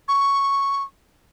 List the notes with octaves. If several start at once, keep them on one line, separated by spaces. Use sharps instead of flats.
C#6